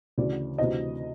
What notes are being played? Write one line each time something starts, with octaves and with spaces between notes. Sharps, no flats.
D2 C#3 E3 D5
D2 C3 E3 D#5